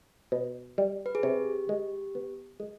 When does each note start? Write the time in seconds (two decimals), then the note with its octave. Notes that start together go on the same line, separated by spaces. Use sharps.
0.32 B2
0.78 G3
1.06 B4
1.15 G#4
1.23 C3 G4
1.69 G#3
2.15 B3
2.60 G#3